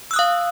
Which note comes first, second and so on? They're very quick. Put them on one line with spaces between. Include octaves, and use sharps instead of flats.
E6 F#6 D#6 F5